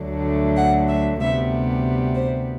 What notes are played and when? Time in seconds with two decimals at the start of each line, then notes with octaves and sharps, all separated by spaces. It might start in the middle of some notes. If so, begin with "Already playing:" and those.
Already playing: D2 D3 F#3 A3
0.56 F#5
0.88 E5
1.20 D2 C3 G3 B3 E5
2.15 C5